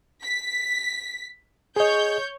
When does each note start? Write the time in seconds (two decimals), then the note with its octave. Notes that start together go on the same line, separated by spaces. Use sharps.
0.23 B6
1.76 G#4 C#5 D#5 G6